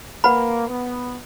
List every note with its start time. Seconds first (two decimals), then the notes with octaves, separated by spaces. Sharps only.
0.24 A#3 B4 F#5 B5
0.68 B3